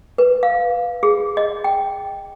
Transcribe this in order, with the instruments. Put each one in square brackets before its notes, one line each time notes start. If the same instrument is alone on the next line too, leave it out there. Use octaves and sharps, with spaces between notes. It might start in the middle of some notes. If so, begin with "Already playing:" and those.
[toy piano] B4
F5
G#4
D#5
G5